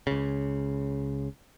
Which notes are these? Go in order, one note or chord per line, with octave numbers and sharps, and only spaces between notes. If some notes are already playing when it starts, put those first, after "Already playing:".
C#2 C#3